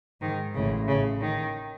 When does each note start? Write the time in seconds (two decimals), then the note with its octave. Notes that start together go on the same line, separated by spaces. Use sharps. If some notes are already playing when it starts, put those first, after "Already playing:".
0.21 G#2 D#3
0.55 A1 A2 C#3
0.88 C#3
1.21 D#3